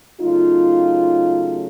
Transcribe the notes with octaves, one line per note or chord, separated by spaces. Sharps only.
C#3 F#3 A3 D#4 F4